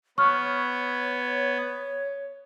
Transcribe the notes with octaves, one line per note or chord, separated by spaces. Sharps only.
B3 C#5 C#6 F6